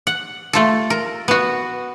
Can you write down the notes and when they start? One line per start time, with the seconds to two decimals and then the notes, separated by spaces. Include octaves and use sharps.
0.07 F#5
0.53 A3 F4 A4
0.90 A#4
1.28 B3 F#4